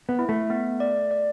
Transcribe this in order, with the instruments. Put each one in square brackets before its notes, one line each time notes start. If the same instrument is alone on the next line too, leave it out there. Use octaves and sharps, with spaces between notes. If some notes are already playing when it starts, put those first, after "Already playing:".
[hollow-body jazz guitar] B3
[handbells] E4
[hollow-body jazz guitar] A3
[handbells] B3
D5
D5